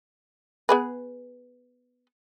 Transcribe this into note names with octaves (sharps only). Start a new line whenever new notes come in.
B3 G#4 B4